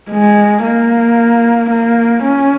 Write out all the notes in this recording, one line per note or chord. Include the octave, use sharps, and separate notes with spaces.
G#3
A#3
A#3
C#4